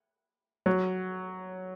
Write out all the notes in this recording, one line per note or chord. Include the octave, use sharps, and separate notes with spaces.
F#3